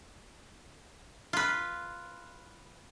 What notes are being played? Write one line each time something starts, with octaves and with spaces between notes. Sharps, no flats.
F4 B4